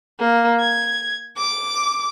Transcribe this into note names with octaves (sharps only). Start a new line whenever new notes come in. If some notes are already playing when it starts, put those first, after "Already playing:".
A#3
G#6
D6